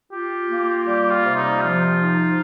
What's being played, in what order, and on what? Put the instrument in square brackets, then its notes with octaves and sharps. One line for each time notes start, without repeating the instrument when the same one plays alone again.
[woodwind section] F4 [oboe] G4
[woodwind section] A#3
[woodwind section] G3 [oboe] G4
[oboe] F4
[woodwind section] C3
[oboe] D#4
[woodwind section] F3 [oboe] F4
[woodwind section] D#4